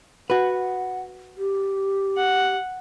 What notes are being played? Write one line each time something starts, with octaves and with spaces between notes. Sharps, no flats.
F#4 B4 F#5
G4
F#5